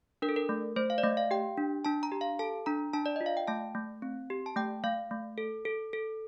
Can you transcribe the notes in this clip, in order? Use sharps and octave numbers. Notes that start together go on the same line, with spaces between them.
D4 A#4
A4
A#4
A3
A3 C5
F5
D5
A3 D#5
F5
G4 G5
D4
D4 A5
A#5
G4
F5
A4 A5
D4 A#5
D4 A5
D5
F4 D#5
F5
G5
A3 A5
A3
C4
G4
A5
A3 G5
A3 F5
A3
A4
A4
A4